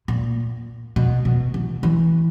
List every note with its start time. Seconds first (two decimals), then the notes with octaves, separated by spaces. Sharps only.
0.08 A#2
0.96 B2
1.25 B2
1.54 E3
1.83 E3